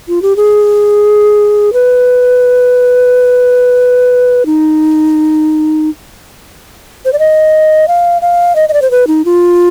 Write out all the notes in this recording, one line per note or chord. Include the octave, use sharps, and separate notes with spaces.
F4
G4
G#4
B4
D#4
C5
D5
D#5
F5
F5
D#5
D#5
D5
C5
B4
D#4
F4